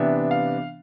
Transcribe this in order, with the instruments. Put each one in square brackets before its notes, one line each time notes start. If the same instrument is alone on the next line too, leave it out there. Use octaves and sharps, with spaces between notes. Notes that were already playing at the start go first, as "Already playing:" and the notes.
Already playing: [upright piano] C3 E3 B3 D4 E5
F5